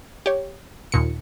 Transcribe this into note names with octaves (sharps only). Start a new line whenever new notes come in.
G4 C#5
D#2 A#2 C#7